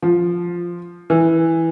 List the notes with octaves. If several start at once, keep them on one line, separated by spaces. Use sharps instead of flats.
F3
E3